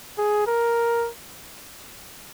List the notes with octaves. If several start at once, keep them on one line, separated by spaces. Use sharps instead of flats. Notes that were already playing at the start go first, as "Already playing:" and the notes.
G#4
A#4